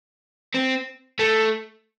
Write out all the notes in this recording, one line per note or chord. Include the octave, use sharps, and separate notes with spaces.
C4
A3